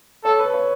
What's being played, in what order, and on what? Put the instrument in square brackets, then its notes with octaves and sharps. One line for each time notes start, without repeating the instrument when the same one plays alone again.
[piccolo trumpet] A4 [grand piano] C#5
[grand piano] B4
C#5